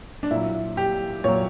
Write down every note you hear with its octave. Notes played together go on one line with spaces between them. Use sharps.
D4
A#2 F#3 E4
G4
A#2 F#3 C#5